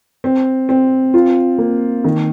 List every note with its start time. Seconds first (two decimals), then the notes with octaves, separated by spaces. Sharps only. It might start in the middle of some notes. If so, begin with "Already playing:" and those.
0.24 C4
0.69 C4
1.14 F4
1.58 A#3
2.04 D#3